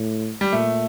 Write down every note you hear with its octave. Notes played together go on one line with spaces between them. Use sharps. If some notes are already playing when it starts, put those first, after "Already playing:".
Already playing: A2
G3
A#2 A3